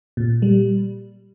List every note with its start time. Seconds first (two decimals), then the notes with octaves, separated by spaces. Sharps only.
0.17 A#2
0.42 G3